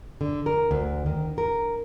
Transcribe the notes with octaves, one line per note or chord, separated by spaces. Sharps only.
D3
A#4
D2
D#3
A#4